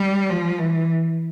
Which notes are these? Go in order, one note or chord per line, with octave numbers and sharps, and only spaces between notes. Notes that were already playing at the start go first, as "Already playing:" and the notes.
Already playing: G3
F3
E3